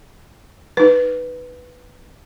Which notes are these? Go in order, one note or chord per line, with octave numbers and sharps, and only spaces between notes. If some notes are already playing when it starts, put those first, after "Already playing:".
D#4 B4